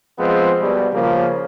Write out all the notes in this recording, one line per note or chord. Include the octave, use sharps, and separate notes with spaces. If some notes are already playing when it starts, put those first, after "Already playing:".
F3 G#3 B3 C4
G2 B2
C#3 F3 A#3